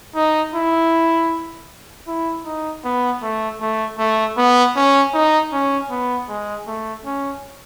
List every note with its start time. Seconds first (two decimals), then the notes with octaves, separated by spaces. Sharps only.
0.15 D#4
0.54 E4
2.08 E4
2.45 D#4
2.84 B3
3.22 A3
3.61 A3
3.99 A3
4.37 B3
4.76 C#4
5.14 D#4
5.53 C#4
5.90 B3
6.29 G#3
6.67 A3
7.05 C#4